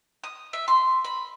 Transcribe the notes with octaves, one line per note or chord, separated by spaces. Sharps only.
D#6
E5
C6
B5